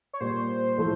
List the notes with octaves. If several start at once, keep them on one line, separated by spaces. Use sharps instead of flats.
C#5
A#2 G3 A#3 C5
A2 F3 A3